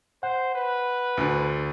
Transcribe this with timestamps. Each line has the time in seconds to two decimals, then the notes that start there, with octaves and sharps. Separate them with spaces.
0.23 C5 F#5
0.55 B4
1.17 D2 D3